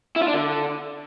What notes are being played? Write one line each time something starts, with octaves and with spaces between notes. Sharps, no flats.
E4
F4
D4
D3